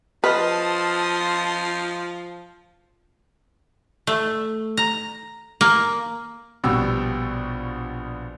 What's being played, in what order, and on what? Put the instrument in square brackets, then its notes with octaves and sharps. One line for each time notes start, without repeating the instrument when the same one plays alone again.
[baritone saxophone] F3 [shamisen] B4 [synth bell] D#5 F6 [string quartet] A5 C6 D#6
[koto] A3
A#5
A#3
[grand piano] A#1 B2 G3 F#4 G5 E6